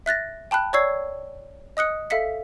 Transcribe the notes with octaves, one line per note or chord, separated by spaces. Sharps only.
E5 F#6 A6 A#6
G5 A5 B5 F#6
C#5 D5 C#6 E6 G#6 C7
D#5 D#6 F#6 C#7
A4 E5 F5 B6 C#7